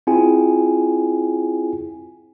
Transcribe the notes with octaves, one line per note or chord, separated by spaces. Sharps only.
C4 E4 F4 G#4 G5 G#5